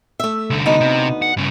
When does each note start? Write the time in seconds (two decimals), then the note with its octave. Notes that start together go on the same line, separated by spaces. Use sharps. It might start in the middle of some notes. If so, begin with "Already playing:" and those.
0.20 A3 E5
0.50 C2 D3
0.66 D2 B3 D#4
0.81 C3
1.22 F#5
1.37 G2 C#3